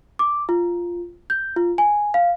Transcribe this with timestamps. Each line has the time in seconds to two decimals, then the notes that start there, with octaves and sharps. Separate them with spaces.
0.19 D6
0.49 F4
1.30 G6
1.56 F4
1.78 G#5
2.14 F5